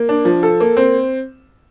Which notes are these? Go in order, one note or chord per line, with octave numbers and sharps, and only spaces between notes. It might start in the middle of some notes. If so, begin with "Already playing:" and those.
Already playing: A#3
D4
F3
A4
A#3
C4